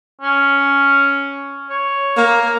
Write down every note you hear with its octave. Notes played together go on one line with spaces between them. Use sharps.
C#4
C#5
A#3